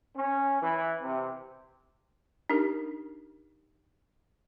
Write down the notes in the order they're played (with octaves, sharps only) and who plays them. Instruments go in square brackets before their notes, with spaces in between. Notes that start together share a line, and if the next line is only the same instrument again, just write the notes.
[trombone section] C#4
E3
C3
[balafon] D4 D#4 G4 A#4